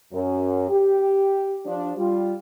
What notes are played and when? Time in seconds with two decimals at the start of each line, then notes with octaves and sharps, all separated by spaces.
0.12 F#2
0.69 G4
1.65 F3 D4
1.97 G3 F4